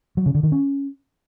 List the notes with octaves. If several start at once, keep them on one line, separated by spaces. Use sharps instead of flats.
F#3
C#3
D3
D#3
C#4